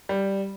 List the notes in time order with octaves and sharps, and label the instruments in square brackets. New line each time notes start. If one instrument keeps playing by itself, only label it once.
[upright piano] G3